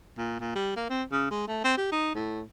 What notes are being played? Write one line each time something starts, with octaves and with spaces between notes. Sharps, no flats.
A#2
A#2
G3
A#3
C4
C#3
G#3
A3
C4
G4
D#4
A2